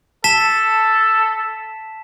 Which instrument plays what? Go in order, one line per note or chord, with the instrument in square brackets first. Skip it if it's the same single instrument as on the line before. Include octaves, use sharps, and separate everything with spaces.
[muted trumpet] A4 [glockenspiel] A5 B6 E7